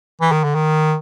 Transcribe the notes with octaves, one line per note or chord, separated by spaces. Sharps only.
E3
D#3
D3
D#3